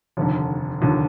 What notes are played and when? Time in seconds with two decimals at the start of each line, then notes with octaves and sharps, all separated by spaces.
0.17 F1 D#2 D3
0.81 F1 D#2 D3